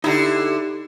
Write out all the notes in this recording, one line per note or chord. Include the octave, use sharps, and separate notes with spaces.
D3 D#4 E4 G4 A#5